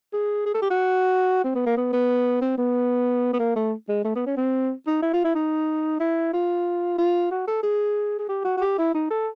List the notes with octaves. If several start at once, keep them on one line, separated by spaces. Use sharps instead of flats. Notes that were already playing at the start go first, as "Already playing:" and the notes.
G#4
G#4
A4
G4
F#4
C4
B3
A#3
B3
B3
C4
B3
B3
A#3
A3
G#3
A3
B3
C#4
C4
D#4
E4
F4
E4
D#4
E4
F4
F4
F#4
A4
G#4
G#4
G4
F#4
F#4
G4
E4
D#4
A4